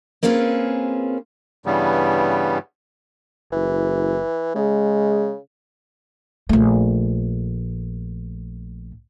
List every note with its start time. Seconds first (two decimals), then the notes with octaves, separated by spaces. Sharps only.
0.23 A#3 C4 C#4 F4 G#4 B4
1.66 G2 C#3 E3 G3 B3
3.52 F#1 E3
4.55 C#3 G#3
6.49 A#1 A3